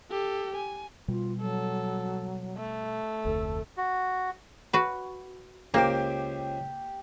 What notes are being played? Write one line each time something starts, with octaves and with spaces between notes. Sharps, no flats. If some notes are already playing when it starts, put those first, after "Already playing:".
G4 A4
G#5
B2 G3 F4
F#3 A4
A3
F1 D2 A4
F#4
F#4 B4
C#2 A#3 G4 C5 G5 D6